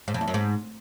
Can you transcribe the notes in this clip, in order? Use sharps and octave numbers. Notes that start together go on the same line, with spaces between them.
G#2
F2
E2
F#2
G#2